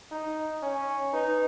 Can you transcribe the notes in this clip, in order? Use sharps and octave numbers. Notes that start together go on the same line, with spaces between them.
D#4
C#4
D#4 B4